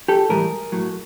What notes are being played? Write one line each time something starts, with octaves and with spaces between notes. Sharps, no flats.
G4 A4
A2 E3 G3 G#4 A#4
A2 F#3